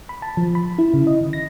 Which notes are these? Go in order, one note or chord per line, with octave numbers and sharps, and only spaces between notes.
B5
A5
F3
B5
E4
C#3
D#5
D#3
A#6